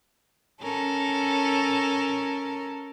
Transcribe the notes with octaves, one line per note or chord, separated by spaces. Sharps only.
C#4 A4 A#4